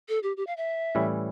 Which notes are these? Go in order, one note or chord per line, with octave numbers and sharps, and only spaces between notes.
A4
G4
G4
F5
E5
A2 E3 G3 C#4 E4